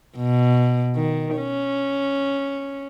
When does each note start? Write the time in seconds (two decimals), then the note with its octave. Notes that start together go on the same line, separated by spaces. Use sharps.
0.17 B2
0.96 D#3
1.37 C#4